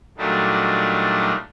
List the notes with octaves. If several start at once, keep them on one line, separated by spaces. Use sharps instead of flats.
A#2 F#3 G3 A3 D4 D#4